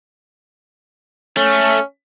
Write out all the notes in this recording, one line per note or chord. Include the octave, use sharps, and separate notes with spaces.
A3 C#4